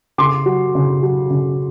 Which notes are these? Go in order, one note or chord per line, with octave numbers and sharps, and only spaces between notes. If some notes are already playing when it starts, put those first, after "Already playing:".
C#3 C6 D6
F#3
C#3
F#3
C#3